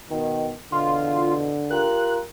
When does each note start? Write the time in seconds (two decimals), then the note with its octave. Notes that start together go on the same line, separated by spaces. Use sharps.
0.10 B2 D#3
0.72 E2 B2 D3 F4
1.71 F4 G4 A#4 F#6